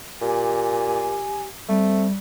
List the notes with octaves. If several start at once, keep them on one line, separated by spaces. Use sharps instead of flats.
A#2 G4 G#5
G3 A3 C4